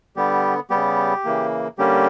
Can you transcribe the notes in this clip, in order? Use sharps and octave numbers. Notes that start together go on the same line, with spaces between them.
D3 G3 B3 G4
C#3 G3 B3 G4
C#3 E3 A#3
D3 G3 A#3 C#4 G4